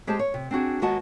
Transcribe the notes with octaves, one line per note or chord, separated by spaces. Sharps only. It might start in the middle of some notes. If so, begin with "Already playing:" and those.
G#3 G4 G#4 C5 A5
C#5
C3
C4 D4 F#4 G#4
D#2 G#3 B3 F#4 D#5 A5